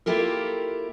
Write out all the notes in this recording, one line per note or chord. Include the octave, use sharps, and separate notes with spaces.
A#3 E4 F4 G4 A4 A#4